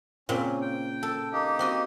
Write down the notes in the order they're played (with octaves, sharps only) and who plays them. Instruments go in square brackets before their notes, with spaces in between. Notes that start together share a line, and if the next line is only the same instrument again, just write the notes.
[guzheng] A#2 C#3 C4 [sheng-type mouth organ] C#4
[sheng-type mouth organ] G5
[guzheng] A4
[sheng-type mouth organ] A#3 D#4 G4
[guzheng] C4 F#4 D#5